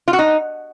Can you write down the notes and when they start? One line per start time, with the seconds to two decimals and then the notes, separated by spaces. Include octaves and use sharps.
0.08 F4
0.13 F#4
0.19 D#4